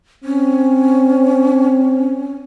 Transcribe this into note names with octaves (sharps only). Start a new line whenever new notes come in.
C4 C#4